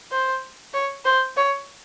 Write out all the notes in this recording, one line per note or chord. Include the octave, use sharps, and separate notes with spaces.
C5
C#5
C5
C#5